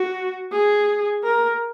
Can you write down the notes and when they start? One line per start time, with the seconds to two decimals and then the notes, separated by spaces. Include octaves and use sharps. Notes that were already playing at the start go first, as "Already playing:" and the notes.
Already playing: F#4
0.52 G#4
1.24 A#4